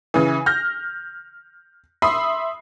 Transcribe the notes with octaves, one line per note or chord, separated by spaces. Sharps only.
C#3 E3
F6 G6 A#6
E5 B5 C6 D#6 C7